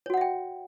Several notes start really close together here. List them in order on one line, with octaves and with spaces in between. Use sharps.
C#5 F#4 F#5 E5 G5